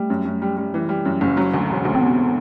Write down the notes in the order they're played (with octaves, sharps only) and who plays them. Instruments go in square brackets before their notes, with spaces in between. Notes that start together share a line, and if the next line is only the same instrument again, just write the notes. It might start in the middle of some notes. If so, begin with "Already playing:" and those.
Already playing: [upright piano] G3 [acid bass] A3
[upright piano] F#2
F#2
G3
G3
E3
G3
F#2
F#1
F#3
D2
E1
D2
[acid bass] C4
[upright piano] C3 [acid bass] B3